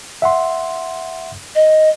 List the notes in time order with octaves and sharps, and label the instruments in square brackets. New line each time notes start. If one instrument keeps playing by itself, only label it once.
[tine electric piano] E5 F#5 C6
[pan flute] D#5